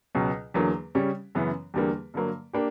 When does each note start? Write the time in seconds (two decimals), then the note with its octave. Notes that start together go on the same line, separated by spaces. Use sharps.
0.15 C#2 B2 F#3
0.54 E2 D3 F#3 A#3
0.95 C#3 G3 C#4
1.35 F#2 C#3 E3 B3
1.74 E2 D3 G3 A#3
2.14 G2 D3 F#3 A#3
2.53 A#3 D4 G4